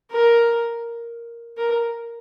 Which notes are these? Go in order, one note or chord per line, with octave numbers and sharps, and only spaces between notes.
A#4
A#4